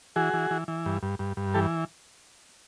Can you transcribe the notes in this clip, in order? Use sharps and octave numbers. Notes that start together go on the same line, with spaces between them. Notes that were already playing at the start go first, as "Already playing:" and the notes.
E3 F#4 G#4
E3
E3
E3
G2
G2
G2
G2
E3 G4 A4